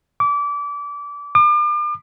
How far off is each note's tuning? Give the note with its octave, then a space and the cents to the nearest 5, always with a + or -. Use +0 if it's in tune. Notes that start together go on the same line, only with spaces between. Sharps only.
D6 -25
D6 +40